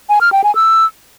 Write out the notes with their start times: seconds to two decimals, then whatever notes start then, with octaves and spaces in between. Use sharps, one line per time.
0.10 G#5
0.21 F6
0.32 G5
0.44 G#5
0.55 E6